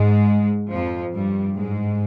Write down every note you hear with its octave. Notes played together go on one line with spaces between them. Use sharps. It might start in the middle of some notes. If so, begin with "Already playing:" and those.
Already playing: G#2 G#3
F2 F3
G2 G3
G#2 G#3